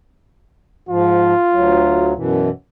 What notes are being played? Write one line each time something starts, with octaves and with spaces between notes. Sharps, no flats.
G#2 F3 F4
D2 F#3
F#2 B2 E3